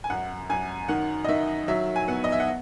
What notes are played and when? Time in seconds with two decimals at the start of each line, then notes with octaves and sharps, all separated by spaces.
0.04 G#5
0.10 F#2 F#5
0.49 F#2 G#5
0.88 D#3 F#5
1.25 D#5
1.28 D#3 E5
1.68 F#3 E5
1.96 G#5
2.08 B3 F#5
2.24 D#5
2.32 E5
2.40 F#5